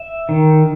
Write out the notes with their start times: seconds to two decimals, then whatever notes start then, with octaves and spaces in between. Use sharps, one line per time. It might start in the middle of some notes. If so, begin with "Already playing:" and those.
Already playing: E5
0.29 D#3